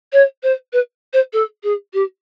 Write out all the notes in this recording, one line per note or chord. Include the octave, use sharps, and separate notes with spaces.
C#5
C5
B4
C5
A4
G#4
G4